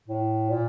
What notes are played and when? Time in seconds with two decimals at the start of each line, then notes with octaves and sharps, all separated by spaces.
0.08 A2
0.49 A#2